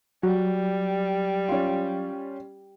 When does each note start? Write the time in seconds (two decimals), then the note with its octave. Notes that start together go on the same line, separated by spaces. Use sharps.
0.23 F#3 G3 F#4
1.49 C#4 F4